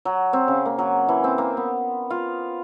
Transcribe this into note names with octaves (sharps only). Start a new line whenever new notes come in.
F#3
C4
C#3
A#3
F#3
E3
C4
A#3
B3
F4